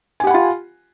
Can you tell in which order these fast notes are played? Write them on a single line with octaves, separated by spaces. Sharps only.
G#5 G4 F#5 B5 F4